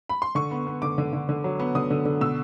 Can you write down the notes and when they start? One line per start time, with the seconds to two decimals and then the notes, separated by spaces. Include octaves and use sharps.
0.09 B5
0.22 C6
0.35 D3 C#6
0.51 B3
0.67 B3
0.82 D3 D6
0.98 D3
1.13 D3
1.29 D3
1.44 F#3
1.59 B3
1.75 D3 D#6
1.90 D3
2.05 D3
2.21 B2 E6